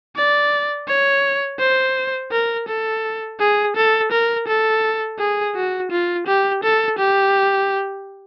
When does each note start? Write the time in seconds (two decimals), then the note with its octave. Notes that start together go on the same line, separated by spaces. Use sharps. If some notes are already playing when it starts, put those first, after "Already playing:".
0.16 D5
0.88 C#5
1.59 C5
2.32 A#4
2.68 A4
3.40 G#4
3.76 A4
4.12 A#4
4.47 A4
5.19 G#4
5.55 F#4
5.91 F4
6.27 G4
6.63 A4
6.98 G4